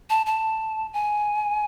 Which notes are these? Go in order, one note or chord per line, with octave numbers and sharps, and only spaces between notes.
A5
A5
G#5